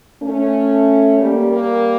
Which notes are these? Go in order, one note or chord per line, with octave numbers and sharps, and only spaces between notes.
A3 C#4
G3 A#3
G3 A#3